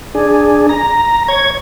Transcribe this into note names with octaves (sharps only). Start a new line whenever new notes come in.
D4 G#4
A#5
C#5 G#6